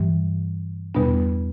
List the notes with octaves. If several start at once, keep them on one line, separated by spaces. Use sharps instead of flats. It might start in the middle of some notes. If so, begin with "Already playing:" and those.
Already playing: G2 E3 G3
E2 B2 G3 B3 D4